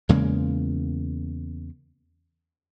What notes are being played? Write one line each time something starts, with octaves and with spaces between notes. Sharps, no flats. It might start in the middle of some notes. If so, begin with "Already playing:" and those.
E2 C#3 G#3 A#3